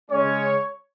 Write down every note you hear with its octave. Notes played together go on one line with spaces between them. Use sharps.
C#3 G#3 C#4 C#5